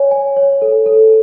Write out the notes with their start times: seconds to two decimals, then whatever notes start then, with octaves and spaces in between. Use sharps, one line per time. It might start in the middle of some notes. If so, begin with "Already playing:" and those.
Already playing: C#5 G#5
0.11 G#5
0.37 C#5
0.62 A4
0.86 A4